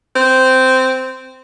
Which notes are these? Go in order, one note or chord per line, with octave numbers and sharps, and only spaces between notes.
C4